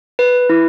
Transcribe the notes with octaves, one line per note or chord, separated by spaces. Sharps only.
B4
E4